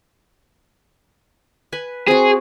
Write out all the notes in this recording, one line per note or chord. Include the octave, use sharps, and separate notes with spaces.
B4 G#5
C4 F#4 G#4